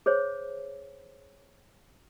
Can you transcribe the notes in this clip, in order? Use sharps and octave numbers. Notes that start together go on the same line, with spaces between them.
G#4 C5 C#5